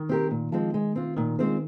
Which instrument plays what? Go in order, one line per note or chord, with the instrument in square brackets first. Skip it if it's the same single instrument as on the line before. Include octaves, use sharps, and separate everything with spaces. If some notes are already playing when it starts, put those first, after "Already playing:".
Already playing: [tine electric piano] D#3
[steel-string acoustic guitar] C4 G4 A#4
A#2
F3 G#3 C4
G#3
C4 F4
[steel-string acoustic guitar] A#2 [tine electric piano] D#3
[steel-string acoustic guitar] G#3 C4 F4 C5